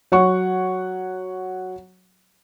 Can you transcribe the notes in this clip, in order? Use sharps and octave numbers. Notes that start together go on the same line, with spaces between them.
F#3 C#5 F#5 C#6